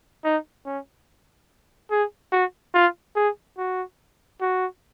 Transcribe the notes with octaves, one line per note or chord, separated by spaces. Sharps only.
D#4
C#4
G#4
F#4
F4
G#4
F#4
F#4